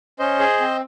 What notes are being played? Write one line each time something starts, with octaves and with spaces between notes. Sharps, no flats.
C#4 C5 D#5
G#4
C4